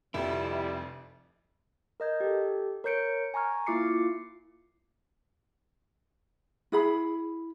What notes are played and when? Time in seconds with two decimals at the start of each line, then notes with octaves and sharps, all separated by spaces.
0.14 F1 F2 B2 D3 G3 E4
2.00 A#4 D#5 G6 G#6
2.20 G4 A4
2.84 A#4 C#5 G6 C#7 D7
3.34 G#5 A#5 C#6 F6 G#6
3.67 A#3 E4 F4 D6 C7 C#7
3.92 F4
6.72 E4 G#4 B5